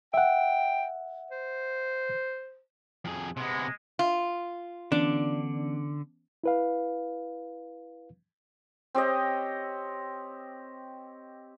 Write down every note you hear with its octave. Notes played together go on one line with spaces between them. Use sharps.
E5 F#5 G5
C5
F2 G#4
C3 G#3 B3
F4
D3 E3 B3 C#4 D4
E4 B4 F5
C4 G4 C#5 D#5